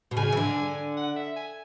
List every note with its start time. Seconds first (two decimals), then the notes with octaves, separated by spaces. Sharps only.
0.11 B2
0.17 C#3 G#5
0.32 E3
0.37 D3
0.97 F#5
1.16 E5
1.36 G#5